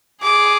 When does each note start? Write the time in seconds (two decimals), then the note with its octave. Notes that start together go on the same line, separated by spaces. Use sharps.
0.23 G#4 D6